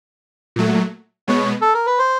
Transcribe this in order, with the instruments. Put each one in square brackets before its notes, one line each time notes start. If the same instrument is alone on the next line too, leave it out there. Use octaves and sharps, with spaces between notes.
[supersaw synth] A#2 F#3 A3
[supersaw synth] B2 G#3 B3 [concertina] C#5
[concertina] A4
A#4
B4
C5